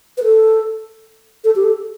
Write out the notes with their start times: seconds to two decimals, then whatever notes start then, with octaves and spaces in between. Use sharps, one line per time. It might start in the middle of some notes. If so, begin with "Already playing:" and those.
0.18 B4
0.24 A4
1.44 A4
1.56 G4
1.65 A4